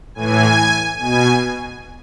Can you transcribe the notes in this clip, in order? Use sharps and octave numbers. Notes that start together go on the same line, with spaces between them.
A2 E3 G#5
B2 G#5